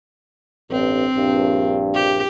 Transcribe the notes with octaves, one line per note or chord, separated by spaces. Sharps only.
A1 G2 C4
A#1 G2
G4